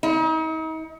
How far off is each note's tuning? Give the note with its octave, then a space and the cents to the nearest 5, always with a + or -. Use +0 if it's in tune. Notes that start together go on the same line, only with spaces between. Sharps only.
D#4 +40